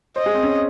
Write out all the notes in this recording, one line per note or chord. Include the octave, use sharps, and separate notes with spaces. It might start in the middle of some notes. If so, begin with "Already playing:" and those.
C5 D#5
G#4
C4
C#4